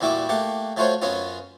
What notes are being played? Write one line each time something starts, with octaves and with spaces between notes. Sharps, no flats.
E2 A#2 G3 E4 F#4 D6
A3 A#3 G4 F#5
F#3 A3 F4 F#4 C5 C#5
F#2 F#3 B3 C#4 F4